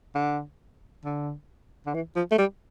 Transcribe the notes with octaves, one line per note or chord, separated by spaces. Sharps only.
D3
D3
D3
E3
F3
A3
G3